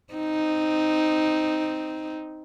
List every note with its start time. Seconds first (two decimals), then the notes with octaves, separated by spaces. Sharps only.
0.14 C4 D#4